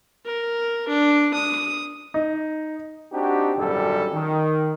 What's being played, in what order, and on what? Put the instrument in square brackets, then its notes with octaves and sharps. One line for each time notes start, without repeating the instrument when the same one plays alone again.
[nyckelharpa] A#4
D4
D#6
[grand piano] D#4
[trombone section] C4 D4 D#4 F#4 G4
G#1 F#2 A#2 D3 G3 A4
D#3